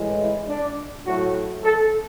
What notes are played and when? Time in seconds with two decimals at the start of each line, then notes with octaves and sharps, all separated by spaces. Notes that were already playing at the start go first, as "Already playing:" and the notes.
Already playing: A2 E3 G#3
0.19 E4
0.49 D4
1.06 A2 F#3 A3 F#4
1.64 A4